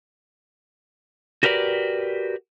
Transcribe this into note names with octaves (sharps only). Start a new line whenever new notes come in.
F#4 G4 A#4 B4 D5